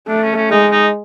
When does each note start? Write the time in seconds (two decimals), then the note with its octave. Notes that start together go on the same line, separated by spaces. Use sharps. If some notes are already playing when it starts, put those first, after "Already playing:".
0.08 A3 D4
0.22 C#4
0.36 C#4
0.50 G#3 D#4
0.72 D#4